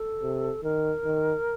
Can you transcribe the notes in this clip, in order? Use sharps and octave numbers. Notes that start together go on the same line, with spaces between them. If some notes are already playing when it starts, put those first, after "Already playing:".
Already playing: A4
C3
D#3 A#4
D#3